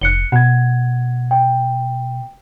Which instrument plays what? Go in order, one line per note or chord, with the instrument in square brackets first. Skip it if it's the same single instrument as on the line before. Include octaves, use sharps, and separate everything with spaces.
[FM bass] F1 [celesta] F#6 C#7 G7
[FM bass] B2 [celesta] F#5 G#6
[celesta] G5